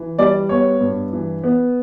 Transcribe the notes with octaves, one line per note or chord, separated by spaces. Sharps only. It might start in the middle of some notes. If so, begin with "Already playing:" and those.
Already playing: E3
G3 D5
B3 C#5
G2
E3
B3